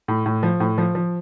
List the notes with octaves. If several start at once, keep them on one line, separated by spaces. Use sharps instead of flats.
A2
A2
F3
A2
F3
F3